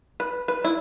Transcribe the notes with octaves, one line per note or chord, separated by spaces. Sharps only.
B4
B4
E4